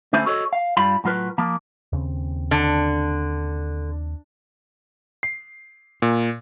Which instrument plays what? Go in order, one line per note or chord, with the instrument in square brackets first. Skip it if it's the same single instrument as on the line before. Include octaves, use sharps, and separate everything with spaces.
[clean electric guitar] D3 A3 C#4 E4 C5 G#5
F#4 A4 C#5 D#5
F5
G2 G3 F4 B5
A2 F#3 F4 B4
F3 A#3
[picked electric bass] D#2 C#3 C4
[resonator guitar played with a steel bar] D3
[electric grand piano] C7
A#2